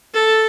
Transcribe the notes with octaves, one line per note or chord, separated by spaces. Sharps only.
A4